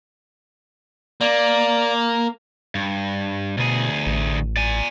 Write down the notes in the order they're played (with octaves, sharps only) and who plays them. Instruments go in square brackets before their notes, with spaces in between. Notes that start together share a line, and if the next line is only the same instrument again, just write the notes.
[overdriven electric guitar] A#3 [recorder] D5
[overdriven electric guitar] G2
[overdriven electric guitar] D2 G#4 [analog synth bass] B2
[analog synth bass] A1
[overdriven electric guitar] D5 G#5